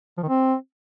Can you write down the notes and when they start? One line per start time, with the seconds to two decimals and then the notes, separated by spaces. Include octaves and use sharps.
0.17 F3
0.23 D#3
0.28 C4